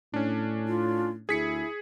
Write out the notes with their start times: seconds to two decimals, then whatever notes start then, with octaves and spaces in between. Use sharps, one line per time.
0.14 A2 C#4 D4
0.68 F4
1.29 D2 E4 G#4 B6 C#7